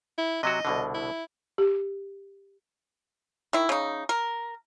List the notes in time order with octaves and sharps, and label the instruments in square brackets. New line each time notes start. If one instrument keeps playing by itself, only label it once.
[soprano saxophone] E4
[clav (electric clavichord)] C3 F#3 F#4 [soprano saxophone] D#5
[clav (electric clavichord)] C2 B2 D3
[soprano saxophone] E4
[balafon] G4
[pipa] D#3 E4
C#3 D#4
A#4